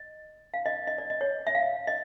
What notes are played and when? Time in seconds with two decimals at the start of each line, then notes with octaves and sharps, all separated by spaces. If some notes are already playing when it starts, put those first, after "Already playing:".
Already playing: D#5
0.54 F5
0.66 D#5
0.87 D#5
0.98 D5
1.10 D#5
1.21 C#5
1.47 E5
1.55 F5
1.87 D#5